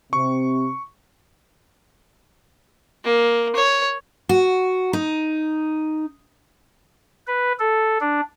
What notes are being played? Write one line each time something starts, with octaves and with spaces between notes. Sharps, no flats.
C3 C#6
A#3
C#5
F#4
D#4
B4
A4
D4